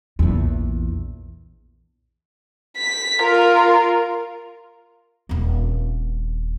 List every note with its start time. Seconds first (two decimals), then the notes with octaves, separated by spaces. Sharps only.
0.19 A#1 E2
2.77 B6
3.21 F4 A#4
5.29 D#1 C4